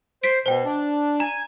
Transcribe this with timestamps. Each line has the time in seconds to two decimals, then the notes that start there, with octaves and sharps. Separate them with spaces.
0.23 C5 B6 D7
0.46 B2 C5 G5
0.65 D4
1.20 G#5 A#5